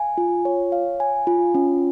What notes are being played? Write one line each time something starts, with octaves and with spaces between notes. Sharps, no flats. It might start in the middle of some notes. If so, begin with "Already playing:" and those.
Already playing: F5 G#5
F4
C#5
F5
G#5
F4
C#4